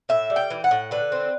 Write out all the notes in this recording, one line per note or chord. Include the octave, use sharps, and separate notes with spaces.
A2 E5
G3
G5
E3
F#5
A2
D3 B4
C4